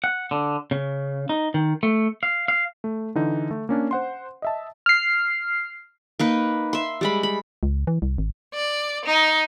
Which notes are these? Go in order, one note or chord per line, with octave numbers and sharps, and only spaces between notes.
F#5
D3
C#3
D#4
D#3
A3
F5
F5
A3
D3 E3 D#4
A3
A#3 C#4 D4
C5 F#5 C6
D#5 E5 A5
F6 C7
A#3 D#4 B4
E5 C6
G3 G#3 B5
B5
C#2
E3
C2
G#1
D5
D#4